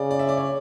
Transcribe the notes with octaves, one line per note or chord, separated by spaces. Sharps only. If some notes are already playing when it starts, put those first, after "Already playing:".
Already playing: C#3 D5
D5
E5
D5
C#5